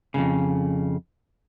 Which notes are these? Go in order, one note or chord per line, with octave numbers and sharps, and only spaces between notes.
F2 G#2 C#3